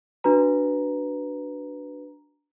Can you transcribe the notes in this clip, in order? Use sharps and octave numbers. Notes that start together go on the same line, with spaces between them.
D4 F#4 B4 A#5